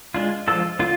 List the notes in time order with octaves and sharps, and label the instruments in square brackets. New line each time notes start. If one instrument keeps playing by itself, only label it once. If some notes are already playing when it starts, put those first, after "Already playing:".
[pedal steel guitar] G#3 D4 F4
F3 G#3 D4 F4 A4
D3 F4